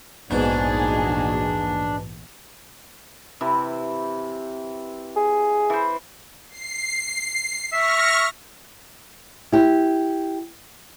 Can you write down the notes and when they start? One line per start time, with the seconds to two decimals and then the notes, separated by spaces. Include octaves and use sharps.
0.31 A#1 E2 G#2 B2 D4 D#4 F#4 G#4
3.41 C3 E3 E4
5.16 G#4
5.70 E3 C5
6.50 C7
7.72 E5 C#6 F6 A#6
9.52 E4 G4